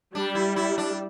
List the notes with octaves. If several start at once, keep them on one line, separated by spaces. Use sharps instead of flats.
G3 D4
E4
E4
D4